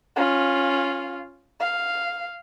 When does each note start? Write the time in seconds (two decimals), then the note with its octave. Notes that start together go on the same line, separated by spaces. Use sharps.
0.16 C#4 F4
1.61 F5